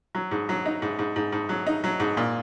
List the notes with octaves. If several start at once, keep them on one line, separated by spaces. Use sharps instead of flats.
F#3
G#2
F#3
D#4
G#2
G#2
G#2
G#2
F#3
D#4
F#3
G#2
A#2